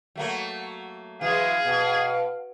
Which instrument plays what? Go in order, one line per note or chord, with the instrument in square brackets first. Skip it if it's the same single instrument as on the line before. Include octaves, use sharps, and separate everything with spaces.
[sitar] F#3 A3 A#3
[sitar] E3 F#3 G#3 [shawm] G#4 [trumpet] F5
[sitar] B2